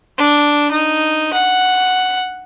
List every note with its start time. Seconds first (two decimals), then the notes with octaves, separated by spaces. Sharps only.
0.18 D4
0.71 D#4
1.33 F#5